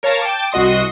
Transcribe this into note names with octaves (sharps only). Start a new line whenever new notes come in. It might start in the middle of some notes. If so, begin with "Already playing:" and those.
A#4 C#5 F5 A5 A#5
G5 A5 D6
C2 F#4 D#5 C6 D#6